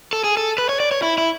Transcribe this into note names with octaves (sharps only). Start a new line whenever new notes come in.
A4
G#4
A4
B4
C#5
D5
C#5
E4
E4